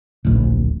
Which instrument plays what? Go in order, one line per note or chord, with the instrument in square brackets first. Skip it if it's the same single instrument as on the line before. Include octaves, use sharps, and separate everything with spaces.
[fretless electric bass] D1 A#1